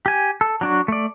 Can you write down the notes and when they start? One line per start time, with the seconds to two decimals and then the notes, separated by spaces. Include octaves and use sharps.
0.06 G4 G#5
0.41 A4
0.61 F#3 D4 F#4
0.88 A3 D5